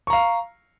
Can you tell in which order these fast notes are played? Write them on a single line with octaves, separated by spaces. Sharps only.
C#6 A#5 F5